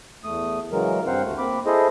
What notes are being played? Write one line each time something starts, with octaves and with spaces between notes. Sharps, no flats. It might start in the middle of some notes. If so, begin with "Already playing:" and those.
E2 A3 D#6
C#3 E3 F#3 G#3 A#4
G2 C4 C5 F5 F#5
D2 A3
A#3 C4 B5 D6
E4 G#4 A4 C5 D#5